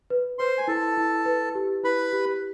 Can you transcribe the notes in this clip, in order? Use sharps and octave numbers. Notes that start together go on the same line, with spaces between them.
B4
B4 C5 C6
G#5
E4 A4 A5
E4
B4
G4
E4 B4 B5
G4